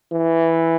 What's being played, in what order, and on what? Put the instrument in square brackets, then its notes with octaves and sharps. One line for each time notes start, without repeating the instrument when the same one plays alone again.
[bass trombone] E3